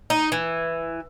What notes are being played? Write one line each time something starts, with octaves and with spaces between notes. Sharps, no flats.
D#4
E3